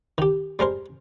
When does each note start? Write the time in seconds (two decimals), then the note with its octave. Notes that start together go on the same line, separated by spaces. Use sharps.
0.18 D#3 G4
0.59 G3 G#3 A#4 C5